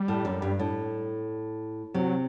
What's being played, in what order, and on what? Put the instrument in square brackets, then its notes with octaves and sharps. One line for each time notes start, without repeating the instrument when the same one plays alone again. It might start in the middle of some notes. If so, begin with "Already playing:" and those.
Already playing: [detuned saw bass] G3
[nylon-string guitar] A2
F#2
G2
A2
[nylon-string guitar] C3 [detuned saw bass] F#3